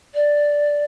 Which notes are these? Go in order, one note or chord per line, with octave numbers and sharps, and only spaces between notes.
D5